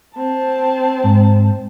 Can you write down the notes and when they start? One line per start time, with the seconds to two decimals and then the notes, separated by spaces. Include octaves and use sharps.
0.15 C4 A5
1.04 G#2